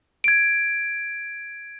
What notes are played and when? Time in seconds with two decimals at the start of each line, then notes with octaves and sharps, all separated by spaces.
0.24 G#6 D7